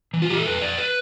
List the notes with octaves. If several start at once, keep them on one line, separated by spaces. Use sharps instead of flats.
E3
F4
E3 G4
A4
F2 B4
F2 D5
B4